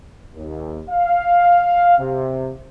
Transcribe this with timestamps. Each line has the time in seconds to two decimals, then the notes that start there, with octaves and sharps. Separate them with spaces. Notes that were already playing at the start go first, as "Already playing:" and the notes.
0.34 D#2
0.90 F5
1.98 C3